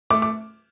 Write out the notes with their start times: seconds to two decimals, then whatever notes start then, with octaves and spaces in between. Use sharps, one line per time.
0.11 A3 D6
0.22 D6